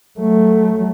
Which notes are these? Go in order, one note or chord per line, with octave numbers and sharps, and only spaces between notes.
F#3 A3